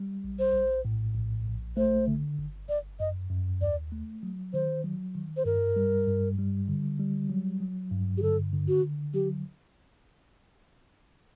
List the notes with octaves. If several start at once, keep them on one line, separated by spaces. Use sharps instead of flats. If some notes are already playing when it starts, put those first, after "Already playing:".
Already playing: G3
A#1
C5
A#1
A2
A#1
A#1
A3 C5
D3
G1
G1 D5
F#2 D#5
F#2
D#2 D5
A3
F#3
D#3 C5
F#3
D#3
C5
G2 A#4
G3
G2
G3
D3
G3
F#3
F#3
G2
G4
D3 A4
D3
F#4
D3
F#3 G4